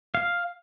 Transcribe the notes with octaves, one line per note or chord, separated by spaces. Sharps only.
F5